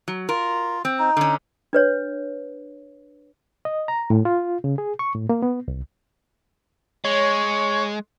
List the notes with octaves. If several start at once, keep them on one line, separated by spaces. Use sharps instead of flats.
F#3
F4 A#4
C4
D#4
D3 C#4
D4 B4 C#5
D#5
A#5
A2
F4
C#3
G#4
C#6
A2
A#3
B3
C2
G#3 C#5